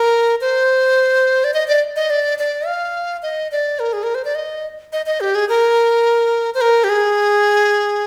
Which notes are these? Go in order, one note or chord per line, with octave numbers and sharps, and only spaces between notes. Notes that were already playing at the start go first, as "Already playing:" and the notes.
Already playing: A#4
C5
D5
D#5
D5
D#5
D5
D5
F5
D#5
D5
A#4
G#4
A#4
C5
D5
D#5
D#5
D#5
G4
G#4
A#4
C5
A#4
G4
G#4